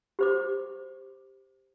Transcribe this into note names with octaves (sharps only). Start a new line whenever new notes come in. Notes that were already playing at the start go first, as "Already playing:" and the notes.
G4 C5 D6